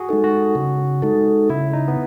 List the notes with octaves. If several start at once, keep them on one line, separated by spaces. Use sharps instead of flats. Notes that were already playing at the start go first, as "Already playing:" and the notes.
Already playing: F#4 G#4
G#3 D#4 A4
F#4
C#3
G#3 D#4 A4
C#3 E4
D#4
B3